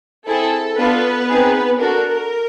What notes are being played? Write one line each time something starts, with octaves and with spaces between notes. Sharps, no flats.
C4 E4 G#4 A4
B3 D4 F4 A4 B4
C4 D#4 G#4
D4 F#4 A4 A#4